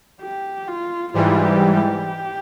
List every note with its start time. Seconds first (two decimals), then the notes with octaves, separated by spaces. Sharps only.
0.21 G4
0.68 F4
1.13 G#2 E3 G3 F4
1.45 G4
1.75 G4